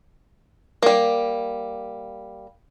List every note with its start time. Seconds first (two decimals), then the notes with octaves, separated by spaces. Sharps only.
0.83 G3 A#3